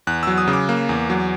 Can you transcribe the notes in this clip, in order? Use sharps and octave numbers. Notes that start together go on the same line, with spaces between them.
E2 F#6
F#3 E6
D#6
C#3
D6
A#3
E2
F#3